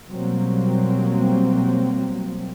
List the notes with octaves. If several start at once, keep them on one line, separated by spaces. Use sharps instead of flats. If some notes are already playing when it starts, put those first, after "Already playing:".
B2 F#3 G3 A#3 C4